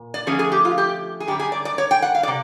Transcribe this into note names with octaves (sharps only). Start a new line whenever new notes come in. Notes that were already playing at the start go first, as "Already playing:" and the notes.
Already playing: A#2
D5
D3 F3 A3 C#4 G#4
G#4
G4
F4
G4
G#4
F#2 D3 G3 G4
G#4
D5
D5
C#5
G5
F#5
F5
D5
C3